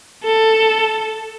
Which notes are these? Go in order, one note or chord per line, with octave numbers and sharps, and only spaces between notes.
A4